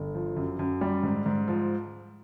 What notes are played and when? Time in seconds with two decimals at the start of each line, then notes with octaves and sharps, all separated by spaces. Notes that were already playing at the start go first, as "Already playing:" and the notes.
Already playing: G1
0.14 F3
0.36 F#2
0.59 F#2
0.81 G3
1.03 G#2
1.26 G#2
1.48 F3